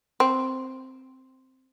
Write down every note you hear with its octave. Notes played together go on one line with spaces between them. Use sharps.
C4